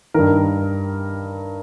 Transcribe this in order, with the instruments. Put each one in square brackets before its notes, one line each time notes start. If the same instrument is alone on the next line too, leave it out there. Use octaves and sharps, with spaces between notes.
[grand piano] G2 D#3 A#4